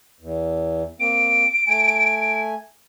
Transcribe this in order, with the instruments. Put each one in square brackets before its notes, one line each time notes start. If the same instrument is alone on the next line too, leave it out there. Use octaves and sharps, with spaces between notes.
[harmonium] E2
[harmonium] A#3 C4 [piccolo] D7
[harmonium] A3 G#5